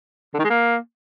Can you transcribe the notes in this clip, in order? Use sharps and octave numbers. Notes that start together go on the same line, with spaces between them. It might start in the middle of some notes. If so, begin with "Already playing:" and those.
D3
D#3
G#3
A#3